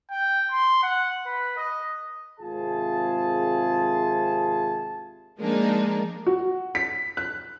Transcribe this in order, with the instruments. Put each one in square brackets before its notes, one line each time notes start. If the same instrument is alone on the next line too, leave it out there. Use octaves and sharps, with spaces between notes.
[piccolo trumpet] G5
C6
F#5
B4
D#5
[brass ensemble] G#1 C3 F4 G#4 A5
[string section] F3 G#3 A#3 D4 D#4
[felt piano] F#4
B6
F#6